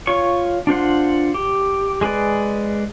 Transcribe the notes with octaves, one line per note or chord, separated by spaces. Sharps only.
F4 C#5 C#6
D4 F4 C5 F#5
G4
G#3 G#4 B4 D5